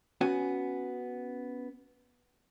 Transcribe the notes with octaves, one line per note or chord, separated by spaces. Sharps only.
B3 C#4 F#4 G#5